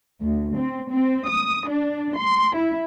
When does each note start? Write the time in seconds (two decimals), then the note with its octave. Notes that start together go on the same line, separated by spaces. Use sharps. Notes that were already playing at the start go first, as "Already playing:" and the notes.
0.21 D2
0.55 C4
0.91 C4
1.28 D#6
1.68 D4
2.16 C6
2.55 E4